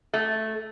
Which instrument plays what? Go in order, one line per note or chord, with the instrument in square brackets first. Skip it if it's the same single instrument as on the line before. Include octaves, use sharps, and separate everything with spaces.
[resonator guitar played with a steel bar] A3